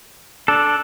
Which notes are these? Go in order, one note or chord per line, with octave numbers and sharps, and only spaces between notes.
D4 A4